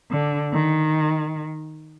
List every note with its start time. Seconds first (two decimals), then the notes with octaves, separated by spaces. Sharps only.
0.11 D3
0.52 D#3